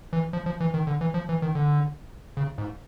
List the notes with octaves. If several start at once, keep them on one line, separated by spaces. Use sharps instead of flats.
E3
F3
F3
E3
D#3
D3
E3
F3
E3
D#3
D3
C#3
G#2